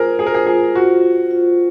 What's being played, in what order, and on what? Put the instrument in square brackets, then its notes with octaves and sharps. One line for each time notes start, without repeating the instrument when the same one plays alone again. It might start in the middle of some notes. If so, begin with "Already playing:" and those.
Already playing: [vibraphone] F4 C5 [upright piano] G#4 A#4
[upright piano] G#4 [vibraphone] C5
[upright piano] A#4
G#4
[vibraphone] F4 [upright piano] G#4
[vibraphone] F4 [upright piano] F#4
[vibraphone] F4
F4